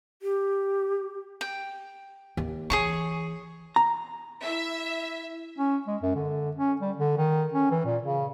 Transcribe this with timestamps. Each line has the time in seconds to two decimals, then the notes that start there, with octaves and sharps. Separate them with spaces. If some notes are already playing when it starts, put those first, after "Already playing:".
0.22 G4
1.41 G5
2.37 D#2
2.70 E3 G#4 C#5 C#6
3.76 A#5
4.43 E4 E5
5.58 C#4
5.87 G#3
6.02 F#2
6.15 D3
6.57 C#4
6.81 G3
6.97 D3
7.18 D#3
7.54 C#4
7.71 E3
7.85 A#2
8.03 C#3